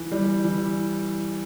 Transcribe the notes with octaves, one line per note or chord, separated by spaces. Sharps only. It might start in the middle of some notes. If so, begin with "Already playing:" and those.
Already playing: E3
G3
E3